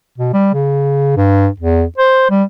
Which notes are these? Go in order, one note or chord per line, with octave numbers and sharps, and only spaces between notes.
B2
G3
C#3
G2
E2
C5
G3